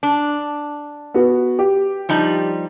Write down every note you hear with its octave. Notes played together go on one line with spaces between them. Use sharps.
D4
B3 F#4
G4
F3 G3 D#4